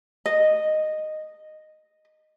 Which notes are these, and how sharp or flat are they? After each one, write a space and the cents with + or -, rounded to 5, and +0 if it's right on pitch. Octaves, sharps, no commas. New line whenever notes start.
D#5 -10